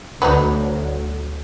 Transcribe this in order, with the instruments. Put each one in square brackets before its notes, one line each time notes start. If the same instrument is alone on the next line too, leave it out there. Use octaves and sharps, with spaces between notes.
[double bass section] D2 F#3 [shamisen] B3 D4 D#4